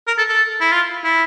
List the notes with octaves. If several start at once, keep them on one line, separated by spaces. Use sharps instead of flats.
A#4
A4
A4
E4
F4
E4